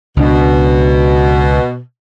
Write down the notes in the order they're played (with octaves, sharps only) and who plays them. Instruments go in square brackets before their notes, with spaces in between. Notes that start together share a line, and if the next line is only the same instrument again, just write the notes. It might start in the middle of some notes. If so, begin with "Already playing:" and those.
[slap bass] C#2 D4 [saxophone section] B2